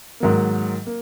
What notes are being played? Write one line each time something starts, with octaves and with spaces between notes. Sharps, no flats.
G#2 D#3 F#3 A#3
A#3